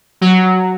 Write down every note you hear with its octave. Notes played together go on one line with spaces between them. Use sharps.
F#3